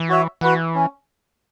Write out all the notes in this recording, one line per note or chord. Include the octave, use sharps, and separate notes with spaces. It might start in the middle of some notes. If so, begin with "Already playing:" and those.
Already playing: E3
F#4 C#5 E5
E3 F#4 B4 F#5
C#4